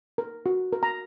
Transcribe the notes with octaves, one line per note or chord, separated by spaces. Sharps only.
A#4
F#4
A#4
A#5